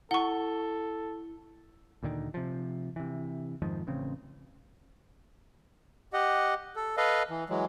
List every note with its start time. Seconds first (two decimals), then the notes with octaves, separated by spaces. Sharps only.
0.11 E4 A4 F#5 C#6 G7
2.03 D2 A#2 D3 D#3
2.34 C3 F3
2.96 C3 E3
3.62 F2 G#2 D#3 F3
3.87 A1 C#3 C4
6.13 G4 D#5 F#5
6.76 A4
6.97 A4 B4 D#5 F5
7.30 E3
7.50 E3 F#3 G#3